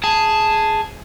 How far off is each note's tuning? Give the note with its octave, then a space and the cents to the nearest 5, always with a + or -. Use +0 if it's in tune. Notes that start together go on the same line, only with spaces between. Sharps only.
G#4 +0 A5 +0